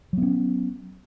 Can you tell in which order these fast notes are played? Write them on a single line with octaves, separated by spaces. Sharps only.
F#3 B3 C#4